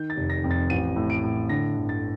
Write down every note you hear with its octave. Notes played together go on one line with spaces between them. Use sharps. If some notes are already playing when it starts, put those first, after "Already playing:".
Already playing: D#3 G6
A6
F1
A#6
F2
A6
A1 D#7
A2
D7
A2
D3 A#6
G1
A6